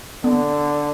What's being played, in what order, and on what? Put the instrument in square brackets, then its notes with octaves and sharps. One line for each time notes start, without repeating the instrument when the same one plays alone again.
[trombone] D3 [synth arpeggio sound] B3